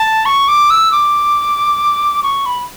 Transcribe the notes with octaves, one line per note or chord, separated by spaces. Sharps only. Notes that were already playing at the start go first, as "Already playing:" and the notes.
Already playing: A5
C#6
D6
E6
D6
C#6
B5